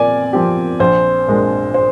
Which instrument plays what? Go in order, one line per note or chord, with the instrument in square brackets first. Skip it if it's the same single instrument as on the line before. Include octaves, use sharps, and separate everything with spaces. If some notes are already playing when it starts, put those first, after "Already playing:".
Already playing: [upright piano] A#2 F3 C4 [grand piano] D5 G#5
[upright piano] F3 C4 G4
[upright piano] A#1 [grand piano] C5
[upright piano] A#2 G#3 D4
[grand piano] C5